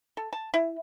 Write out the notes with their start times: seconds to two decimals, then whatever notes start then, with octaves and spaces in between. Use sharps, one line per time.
0.17 A4
0.33 A5
0.54 E4